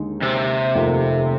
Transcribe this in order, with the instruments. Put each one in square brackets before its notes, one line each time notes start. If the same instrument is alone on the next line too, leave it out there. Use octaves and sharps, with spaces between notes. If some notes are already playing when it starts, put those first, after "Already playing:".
Already playing: [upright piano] D#2 D3 G#3 D#4
[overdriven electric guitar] C3
[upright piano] F1 D#2 D#3 A#3 F4